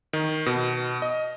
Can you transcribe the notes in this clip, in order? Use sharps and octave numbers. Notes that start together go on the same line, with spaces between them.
D#3
B2
D#5